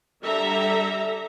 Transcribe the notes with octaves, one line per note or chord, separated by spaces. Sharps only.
D3 G3 A4 E5 A#5